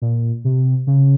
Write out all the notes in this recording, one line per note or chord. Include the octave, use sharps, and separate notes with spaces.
A#2
C3
C#3